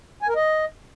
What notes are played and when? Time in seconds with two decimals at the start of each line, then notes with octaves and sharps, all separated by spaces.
0.22 G#5
0.29 A#4
0.36 D#5